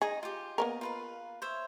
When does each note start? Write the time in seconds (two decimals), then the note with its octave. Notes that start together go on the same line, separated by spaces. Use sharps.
0.02 D#4 G#4 D#5
0.23 F4 G4
0.58 A#3 B3 A#4 D#5
0.81 F4 B4 F5
1.42 C5 C#5 E5